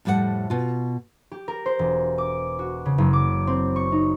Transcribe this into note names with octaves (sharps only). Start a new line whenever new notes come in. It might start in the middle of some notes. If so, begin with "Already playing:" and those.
F2 A2 G3 A4 F#5
B2 F4
G4
A#4
C5
E1
D6
F#4
C#3
F#1
D6
C4
C#6
D#4